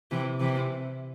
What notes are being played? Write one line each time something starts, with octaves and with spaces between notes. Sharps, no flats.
C3 E3
C3 E3